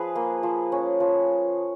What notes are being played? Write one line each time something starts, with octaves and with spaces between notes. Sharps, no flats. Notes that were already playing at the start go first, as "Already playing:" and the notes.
Already playing: F3 G#4 B4
A#3
F3
C#4
F3